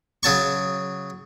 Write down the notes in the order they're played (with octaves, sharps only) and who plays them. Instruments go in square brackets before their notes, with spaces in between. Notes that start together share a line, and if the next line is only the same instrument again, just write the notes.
[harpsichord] C#3 F#3 A5 C#6